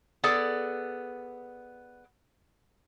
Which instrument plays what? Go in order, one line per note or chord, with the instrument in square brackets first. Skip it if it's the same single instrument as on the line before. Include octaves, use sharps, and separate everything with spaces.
[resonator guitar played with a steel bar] B3 G#4 A4 D5